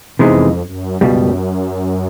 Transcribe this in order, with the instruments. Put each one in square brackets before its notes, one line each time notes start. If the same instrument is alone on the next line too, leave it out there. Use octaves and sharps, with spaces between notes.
[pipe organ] F2 [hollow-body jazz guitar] C3 E3 G#3 B3 D#4
[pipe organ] F#2
[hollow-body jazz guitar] C#2 B2 G3 [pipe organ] F#2